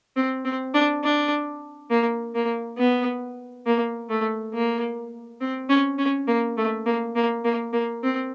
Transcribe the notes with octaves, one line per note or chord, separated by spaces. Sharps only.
C4
C4
D4
D4
A#3
A#3
B3
A#3
A3
A#3
C4
C#4
C#4
A#3
A3
A#3
A#3
A#3
A#3
C4